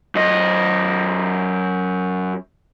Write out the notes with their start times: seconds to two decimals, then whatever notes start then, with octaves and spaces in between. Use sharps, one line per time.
0.15 F#2 D#5